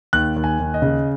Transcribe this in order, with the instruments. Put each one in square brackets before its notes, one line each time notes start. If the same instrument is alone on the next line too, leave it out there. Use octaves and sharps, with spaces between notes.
[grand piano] D#2 F#6
D#2
G#5
D#2
D#5
C#3